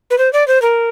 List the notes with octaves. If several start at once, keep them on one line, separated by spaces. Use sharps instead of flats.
B4
C5
D5
C5
A#4